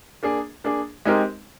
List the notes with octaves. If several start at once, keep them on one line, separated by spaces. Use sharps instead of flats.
A#3 D4 G#4
A#3 D4 G#4
G#3 C4 D#4 G4 A#4